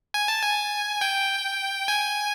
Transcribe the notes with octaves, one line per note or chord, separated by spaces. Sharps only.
G#5
A5
G#5
G5
G#5